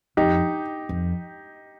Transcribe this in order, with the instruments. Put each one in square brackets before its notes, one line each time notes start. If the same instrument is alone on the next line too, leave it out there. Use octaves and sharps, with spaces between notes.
[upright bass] F2 [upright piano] D#4 G4
[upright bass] F2